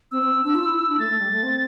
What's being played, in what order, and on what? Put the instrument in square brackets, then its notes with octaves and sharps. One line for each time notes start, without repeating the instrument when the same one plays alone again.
[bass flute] C4 [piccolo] E6
[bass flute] C4
C4
D4
F4
E4
E4
D4
[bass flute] A3 [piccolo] A6
[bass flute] A3
G3
A3
C4